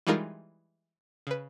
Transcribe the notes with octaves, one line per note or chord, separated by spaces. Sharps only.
E3 G3 G#3 D#4 F4 A#4
C#3 B4